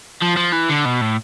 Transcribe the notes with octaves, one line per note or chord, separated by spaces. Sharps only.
F3
F3
E3
D3
B2
A2